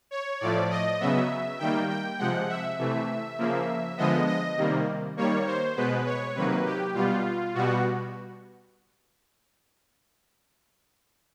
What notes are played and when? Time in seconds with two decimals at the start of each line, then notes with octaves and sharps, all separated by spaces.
0.11 C#5
0.40 A2 F3 A3 D5
0.70 D#5
1.00 C#3 F#3 B3 E5
1.59 D#3 G3 A#3 G5
1.89 G5
2.19 C3 F3 G#3 F#5
2.49 E5
2.79 C3 E3 A3
3.38 C#3 F3 A#3
3.97 D3 F3 G#3 B3 D#5
4.27 D#5
4.57 C3 D#3 G3 A#3
5.17 D#3 G3 A#3 C#5
5.47 C5
5.76 B2 G#3 B3 B4
6.06 C#5
6.35 C3 D#3 F#3 A#3 B4
6.65 G4
6.95 B2 G3 B3 F4
7.55 B2 G3 B3 F#4